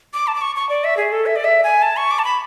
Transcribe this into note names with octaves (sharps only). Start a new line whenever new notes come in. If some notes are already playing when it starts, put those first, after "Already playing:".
D6
A5
D6
C#6
C#6
D5
E5
G#4
A4
E5
D5
E5
G#5
A5
C#6
D6
A5
B5